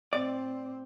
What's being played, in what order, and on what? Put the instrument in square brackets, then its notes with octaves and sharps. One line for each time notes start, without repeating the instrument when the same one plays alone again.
[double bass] A2 C4 [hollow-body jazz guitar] D5